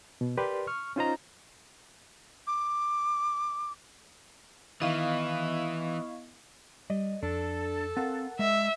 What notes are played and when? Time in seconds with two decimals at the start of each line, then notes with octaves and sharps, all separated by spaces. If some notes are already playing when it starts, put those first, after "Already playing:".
0.21 B2
0.37 G4 A#4 B4 D5 C6
0.67 C#6 F6
0.96 C#4 D#4 F4 C5 D#5 A#5
2.47 D6
4.81 D#3 E3 B3 E4 D#5 F5 C#6 D#6
6.90 G3 D5 D#5
7.23 F2 D4 A4
7.97 C4 A#4 F5 F#5
8.39 G#3 D#5 E5